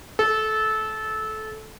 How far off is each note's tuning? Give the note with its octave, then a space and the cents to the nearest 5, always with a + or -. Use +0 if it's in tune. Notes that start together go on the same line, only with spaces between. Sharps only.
A4 -20